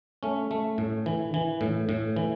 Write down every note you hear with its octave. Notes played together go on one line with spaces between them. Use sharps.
A3 C#4
A3
A2
E3
E3
A2
A2
E3